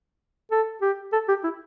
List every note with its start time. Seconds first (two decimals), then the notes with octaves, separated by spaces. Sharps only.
0.52 A4
0.82 G4
1.13 A4
1.29 G4
1.44 E4